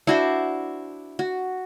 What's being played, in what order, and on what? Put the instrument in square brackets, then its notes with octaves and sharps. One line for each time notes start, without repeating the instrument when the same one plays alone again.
[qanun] D4 F#4 C5 [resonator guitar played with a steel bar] E4
[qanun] F#4